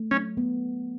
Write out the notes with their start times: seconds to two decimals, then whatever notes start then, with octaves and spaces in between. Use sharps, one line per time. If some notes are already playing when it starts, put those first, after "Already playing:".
Already playing: A3
0.11 F#3 C#4
0.37 B3